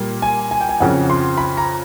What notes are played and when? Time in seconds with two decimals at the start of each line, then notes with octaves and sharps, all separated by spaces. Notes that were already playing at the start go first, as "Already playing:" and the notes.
Already playing: A#2 G3 A#3
0.22 G#5
0.51 G#5
0.61 G5
0.69 G#5
0.80 F2 C#3 F3 F#5
1.10 C6
1.38 B5
1.57 A#5